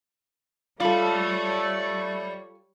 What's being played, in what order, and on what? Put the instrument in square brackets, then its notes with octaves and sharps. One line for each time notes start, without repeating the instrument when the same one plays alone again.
[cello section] G3 C#5 [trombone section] A3 [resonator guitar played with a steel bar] F4 A4 [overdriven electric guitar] D5 B5